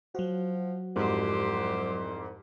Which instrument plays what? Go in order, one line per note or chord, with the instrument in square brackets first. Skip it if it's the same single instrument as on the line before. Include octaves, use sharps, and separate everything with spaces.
[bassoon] F3 [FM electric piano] F#3 F#4
[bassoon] C2 [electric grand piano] F2 G#2 [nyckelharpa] G4 C5